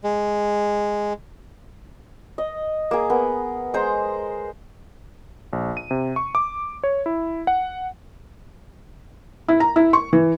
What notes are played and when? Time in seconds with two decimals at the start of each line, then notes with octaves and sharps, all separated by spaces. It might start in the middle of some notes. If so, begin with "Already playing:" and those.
0.04 G#3
2.38 D#5
2.91 A#3 G#4
3.10 B3 A#4
3.74 G#3 C5 A#5
5.53 A#1
5.77 D#7
5.91 C3
6.16 C#6
6.35 D6
6.84 C#5
7.06 E4
7.47 F#5
9.48 E4
9.60 A#5
9.76 E4
9.93 C#6
10.13 E3